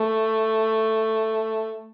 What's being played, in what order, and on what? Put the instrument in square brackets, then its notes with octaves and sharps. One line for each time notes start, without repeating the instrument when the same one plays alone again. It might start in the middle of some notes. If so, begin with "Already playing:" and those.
Already playing: [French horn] A3